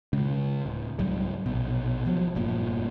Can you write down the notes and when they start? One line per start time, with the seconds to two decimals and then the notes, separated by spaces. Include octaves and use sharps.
0.13 C#3 G#3
0.66 D1
0.99 C#2 G#2 F#3 G3
1.46 A#1 B2
2.05 C2 F3 F#3
2.35 F1 G2 A#2